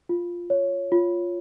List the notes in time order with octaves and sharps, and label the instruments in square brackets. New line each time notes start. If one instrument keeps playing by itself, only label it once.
[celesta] F4
C#5
F4